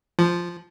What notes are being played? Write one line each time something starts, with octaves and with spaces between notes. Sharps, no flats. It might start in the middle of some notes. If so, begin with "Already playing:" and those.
F3